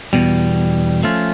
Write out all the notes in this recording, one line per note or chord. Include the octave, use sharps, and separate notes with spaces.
E2 B2 G3
F3 A3 C#4 F4